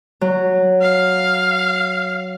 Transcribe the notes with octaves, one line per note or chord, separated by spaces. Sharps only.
F#3
F5